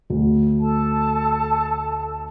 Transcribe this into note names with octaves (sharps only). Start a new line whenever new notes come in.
D2
A4 A5